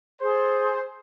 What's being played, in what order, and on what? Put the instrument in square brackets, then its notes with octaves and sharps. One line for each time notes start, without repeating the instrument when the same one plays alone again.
[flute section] G#4 A4 C6 [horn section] C5